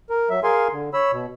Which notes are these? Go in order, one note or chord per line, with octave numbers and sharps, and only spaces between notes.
A#4
F#3 E5
G#4 A#4 F5 G#5 C6
D3
C#5 B5 E6
B2